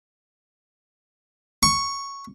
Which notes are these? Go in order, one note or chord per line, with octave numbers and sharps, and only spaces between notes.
C#6